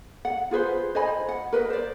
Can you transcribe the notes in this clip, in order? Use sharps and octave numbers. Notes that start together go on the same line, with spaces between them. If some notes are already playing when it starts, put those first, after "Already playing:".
F#5
F4 G#4 B4 C5
C5 D#5 G#5 B5
F#5
A#4 B4 D#5
C5 D5